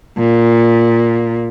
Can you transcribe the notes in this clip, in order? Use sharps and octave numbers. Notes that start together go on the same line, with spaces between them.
A#2